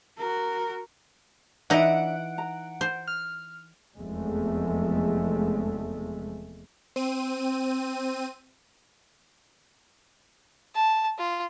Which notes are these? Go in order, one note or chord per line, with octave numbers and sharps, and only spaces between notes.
F#4 A#4
E3 D4 D#4 E5 F#5 D7
A#5
C5
F6
F1 E2 F3 G#3 A3
C4 D#7
A5
F4